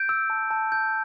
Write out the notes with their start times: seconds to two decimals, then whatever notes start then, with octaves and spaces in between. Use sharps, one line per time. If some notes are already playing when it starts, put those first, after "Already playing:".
Already playing: G6 D7
0.09 E6
0.30 A5
0.50 A5
0.72 G6